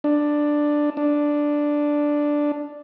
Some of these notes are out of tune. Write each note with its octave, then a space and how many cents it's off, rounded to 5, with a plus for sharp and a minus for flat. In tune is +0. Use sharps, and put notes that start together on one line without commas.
D4 +5
D4 +0